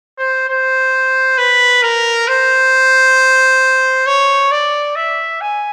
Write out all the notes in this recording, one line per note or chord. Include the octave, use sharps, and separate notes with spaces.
C5
C5
B4
A#4
C5
C#5
D5
E5
G#5